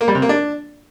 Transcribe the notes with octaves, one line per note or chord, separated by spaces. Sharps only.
A#3
G3
C3
A#3
D4